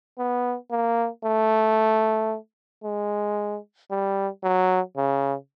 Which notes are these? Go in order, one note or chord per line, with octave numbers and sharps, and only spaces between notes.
B3
A#3
A3
G#3
G3
F#3
C#3